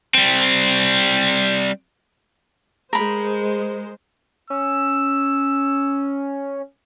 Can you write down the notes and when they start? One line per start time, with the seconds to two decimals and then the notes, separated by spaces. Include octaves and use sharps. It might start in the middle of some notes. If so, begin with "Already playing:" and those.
0.15 G3 C4
2.93 G#3 A#4 C5 B5
4.50 C#4 E6